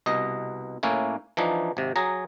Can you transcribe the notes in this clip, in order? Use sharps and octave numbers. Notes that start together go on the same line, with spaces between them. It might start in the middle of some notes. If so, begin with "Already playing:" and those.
C2 B2 D#5
A2 A#3 C#4 E4
E3 F3 D4 D#4
G#1 C3
F#3 G#4 A#5